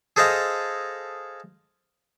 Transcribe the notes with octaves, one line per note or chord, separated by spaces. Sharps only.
G#4 A4 C5 D#5 F5